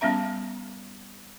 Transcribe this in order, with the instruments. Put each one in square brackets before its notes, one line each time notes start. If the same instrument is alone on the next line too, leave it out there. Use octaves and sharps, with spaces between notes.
[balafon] G3 B3 C#4 E5 A#5